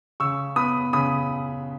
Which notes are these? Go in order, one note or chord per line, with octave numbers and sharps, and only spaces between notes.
C#3 C#6 E6
B3 B5 D#6
C#3 B5 D#6